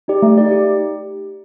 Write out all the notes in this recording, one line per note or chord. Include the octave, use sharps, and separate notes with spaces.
D#4 G4 D5
A3
D#4 G4 D5
G4